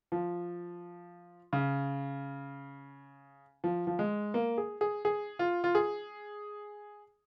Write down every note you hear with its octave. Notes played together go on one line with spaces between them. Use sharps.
F3
C#3
F3
F3
G#3
A#3
G#4
G#4
G#4
F4
F4
G#4